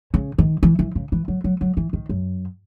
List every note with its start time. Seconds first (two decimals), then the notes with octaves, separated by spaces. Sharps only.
0.14 C#3
0.38 D#3
0.63 E3
0.79 E3
0.95 C#3
1.12 E3
1.28 F#3
1.44 F#3
1.61 F#3
1.77 E3
1.93 D#3
2.09 F#2